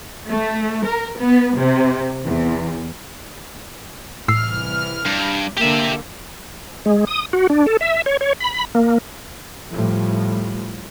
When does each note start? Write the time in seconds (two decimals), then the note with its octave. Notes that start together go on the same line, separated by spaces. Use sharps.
0.27 A3
0.85 A#4
1.19 B3
1.57 C3
2.24 E2
4.28 C2 A2 E3 E6 F6 C7
5.06 G2
5.57 D3 A#3 G4 E5
6.86 G#3
7.07 D#6
7.33 F#4
7.50 D4
7.66 A4
7.81 E5
8.06 C#5
8.21 C#5
8.40 B5
8.75 A#3
9.71 A2 F3 G3